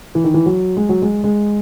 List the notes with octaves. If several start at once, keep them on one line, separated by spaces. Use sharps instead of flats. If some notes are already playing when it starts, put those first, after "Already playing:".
E3
D#3
E3
F#3
G#3
F#3
G#3
G#3